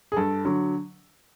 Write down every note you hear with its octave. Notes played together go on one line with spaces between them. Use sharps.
G#4
G2 A4
D3 F#3